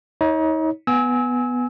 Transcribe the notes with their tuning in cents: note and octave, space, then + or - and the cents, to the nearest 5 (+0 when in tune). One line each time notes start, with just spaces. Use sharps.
D#4 +35 C#5 +0
B3 +0 G#5 +0 E6 -30